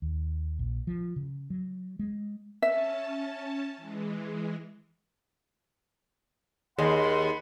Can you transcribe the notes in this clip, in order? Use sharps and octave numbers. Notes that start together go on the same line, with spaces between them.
D#2
A#1
F3
C#3
F#3
G#3
C#4 E5 A5
E3 G#3
D#2 G#4 D#5 F#5 B5 C6